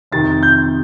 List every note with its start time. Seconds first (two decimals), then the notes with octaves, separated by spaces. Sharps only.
0.12 F2 C3 D#3 A6
0.43 G6